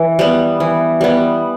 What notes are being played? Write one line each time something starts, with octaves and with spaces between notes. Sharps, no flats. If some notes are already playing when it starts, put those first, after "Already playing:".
Already playing: E3
G3 B3
E3
G3 B3